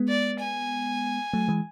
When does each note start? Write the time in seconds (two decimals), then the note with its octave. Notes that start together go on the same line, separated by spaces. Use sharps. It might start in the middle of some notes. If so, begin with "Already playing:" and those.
Already playing: G#3 B3
0.08 D5
0.39 G#5
1.33 F#3 A3
1.48 E3 G#3